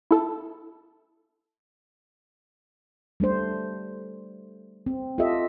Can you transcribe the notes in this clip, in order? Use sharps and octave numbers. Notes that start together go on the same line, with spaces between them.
E4 A4
G3 A3 D4 C5
C4
F4 G4 A4 D#5 E5